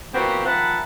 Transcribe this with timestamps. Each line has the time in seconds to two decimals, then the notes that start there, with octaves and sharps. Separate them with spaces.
0.13 A#2 E3 B3 C4 F#4 G4
0.45 D#3 F3 E5 F#5 A5 B5